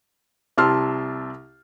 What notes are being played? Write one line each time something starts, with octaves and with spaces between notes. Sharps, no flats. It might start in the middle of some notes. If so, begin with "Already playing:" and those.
C2 G4 A5 C6 E6 F6